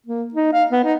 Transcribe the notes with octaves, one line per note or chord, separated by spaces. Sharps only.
A#3
D#4
F5
B3
D#4